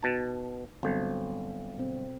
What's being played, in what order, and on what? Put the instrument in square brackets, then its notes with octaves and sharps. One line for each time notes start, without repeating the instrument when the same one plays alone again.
[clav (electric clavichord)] B2 A5 [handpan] D#4
[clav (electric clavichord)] G1 [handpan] F#3 C4 A4
[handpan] B2 C4